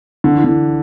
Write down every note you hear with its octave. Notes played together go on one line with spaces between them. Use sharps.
D3
E3
D3